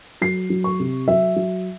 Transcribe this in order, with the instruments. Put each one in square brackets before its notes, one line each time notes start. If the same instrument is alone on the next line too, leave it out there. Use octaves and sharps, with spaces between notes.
[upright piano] F#3 C7
F#3
C#6
C3
F#3 E5
F#3